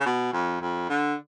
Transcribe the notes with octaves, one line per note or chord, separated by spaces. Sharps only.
C#3
B2
F2
F2
D3